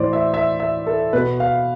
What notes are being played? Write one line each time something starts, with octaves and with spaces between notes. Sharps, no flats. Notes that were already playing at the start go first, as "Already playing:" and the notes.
Already playing: A2 E3 C5 D5
E5
E5
E5
A4
B2 B4
F5